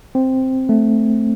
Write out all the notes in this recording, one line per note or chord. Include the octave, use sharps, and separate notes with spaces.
C4
A3